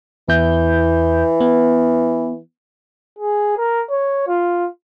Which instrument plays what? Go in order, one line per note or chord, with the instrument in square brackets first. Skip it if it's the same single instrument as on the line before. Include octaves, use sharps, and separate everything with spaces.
[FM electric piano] E2 E4 G6 [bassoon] E3
[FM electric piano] B3
[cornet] G#4
A#4
C#5
F4